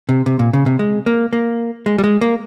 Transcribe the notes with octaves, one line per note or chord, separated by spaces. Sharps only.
C3
C3
A#2
C#3
C3
G#3
A#3
A#3
G#3
G3
G#3
A#3